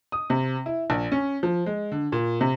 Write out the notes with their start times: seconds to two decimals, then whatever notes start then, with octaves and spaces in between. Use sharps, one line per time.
0.12 D#6
0.30 C3
0.66 E4
0.90 A#1
1.12 C#4
1.43 F3
1.66 G#3
1.92 D3
2.12 A#2
2.41 C3